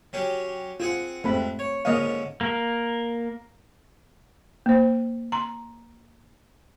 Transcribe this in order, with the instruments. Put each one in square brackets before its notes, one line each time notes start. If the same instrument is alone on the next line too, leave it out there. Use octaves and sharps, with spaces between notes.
[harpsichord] F#3 C#4 G4
[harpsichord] C4 G#4 F#5 [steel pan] F4
[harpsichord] F2 G#2 [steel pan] A3 C4 B5
[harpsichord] C#5
[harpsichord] G#2 D3 C#4 [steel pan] A#3 D#5 F5
[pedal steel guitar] A#3 A#4
[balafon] A#3 C5
A#5 C6